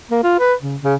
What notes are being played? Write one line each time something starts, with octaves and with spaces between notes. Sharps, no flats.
A#3
F4
B4
C#3
C#3